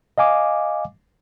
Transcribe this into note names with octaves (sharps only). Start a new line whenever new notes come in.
D#5 F5 G#5 D6